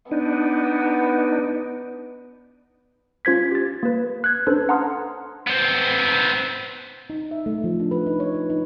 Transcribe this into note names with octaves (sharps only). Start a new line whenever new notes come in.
B3 D4 D#4
C#4 F4 C5 G#6 B6
G4 A6
A#3 B4
F#6 G#6
C#4 D4 A4 B4 C5
F#5 A5 A#5 C6 D#6 F6
B3 C4
D#4
E5
A3
F3
D4
B4
D#4
C#5
B4
D#4